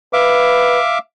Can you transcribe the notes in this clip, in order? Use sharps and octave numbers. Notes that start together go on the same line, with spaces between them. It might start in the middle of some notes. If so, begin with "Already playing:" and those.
B4 E5 F5 D6